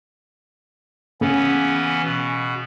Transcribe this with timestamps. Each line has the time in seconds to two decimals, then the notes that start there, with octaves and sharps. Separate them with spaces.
1.21 C#3 E3 B3 C#4
2.04 B2